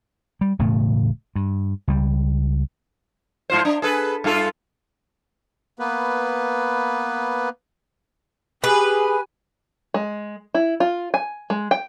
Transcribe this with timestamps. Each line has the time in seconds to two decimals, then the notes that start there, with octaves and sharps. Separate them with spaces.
0.41 G3
0.59 E1 A2 C#3 A3
1.36 G2
1.88 C#2 G3
3.50 G#2 F4 C5
3.65 D4
3.82 G#4 A4 B4
4.24 G2 F4 A4
5.79 A#3 B3 B4
8.64 G4 G#4 B4 G#5
9.94 G#3
10.54 E4
10.80 F4
11.14 G#5
11.50 G#3
11.71 G5